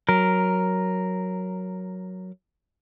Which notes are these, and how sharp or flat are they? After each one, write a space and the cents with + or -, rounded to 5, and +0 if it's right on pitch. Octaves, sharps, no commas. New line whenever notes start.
F#3 +0 A#4 +0